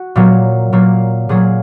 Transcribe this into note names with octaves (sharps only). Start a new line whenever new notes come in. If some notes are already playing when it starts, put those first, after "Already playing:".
Already playing: F#4
A#2 F#3 A#3
A#2 F#3 A#3
A#2 F#3 A#3 G#4